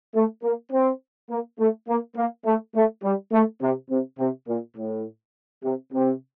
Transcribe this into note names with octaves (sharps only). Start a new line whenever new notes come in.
A3
A#3
C4
A#3
A3
A#3
A#3
A3
A3
G3
A3
C3
C3
C3
A#2
A2
C3
C3